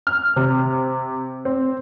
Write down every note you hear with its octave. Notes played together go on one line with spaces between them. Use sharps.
F6
C3
C4